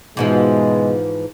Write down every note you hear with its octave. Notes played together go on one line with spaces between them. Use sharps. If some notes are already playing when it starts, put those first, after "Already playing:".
G#2 B2 E3 F3 G#3